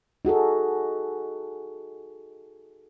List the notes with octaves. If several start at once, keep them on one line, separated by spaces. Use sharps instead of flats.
D#4 F#4 G#4 A4